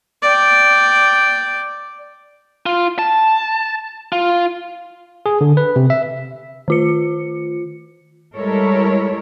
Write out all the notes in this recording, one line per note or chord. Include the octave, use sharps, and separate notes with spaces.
D5 G5
F4
A5
F4
G#4
D3
B4
C3
E5
D#3 F4 C#7
G3 G#3 E4 A4 A#4 C#5